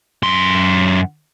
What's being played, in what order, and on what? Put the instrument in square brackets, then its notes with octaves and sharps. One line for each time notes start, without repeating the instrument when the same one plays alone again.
[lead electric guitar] F#2 C6